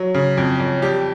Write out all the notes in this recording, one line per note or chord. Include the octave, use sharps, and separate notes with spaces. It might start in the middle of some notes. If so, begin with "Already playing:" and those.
Already playing: F#3
C#3
F2
F2
G3 G4